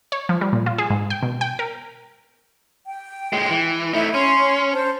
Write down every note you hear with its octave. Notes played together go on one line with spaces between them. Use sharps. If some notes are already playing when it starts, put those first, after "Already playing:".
C#5
F3
G3
A#2
F4
G#4
G#2
G5
B2
G5
A#4
G5
A#2 G#3
E3
A3 D#4 E4
C#4 C#5 C6
C5 A5